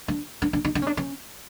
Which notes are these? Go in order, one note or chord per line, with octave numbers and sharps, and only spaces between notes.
D4
D4
D4
D#4
D4
C#4
D4
C#4